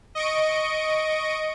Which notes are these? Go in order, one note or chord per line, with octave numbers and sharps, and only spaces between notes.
D#5 C#6 D7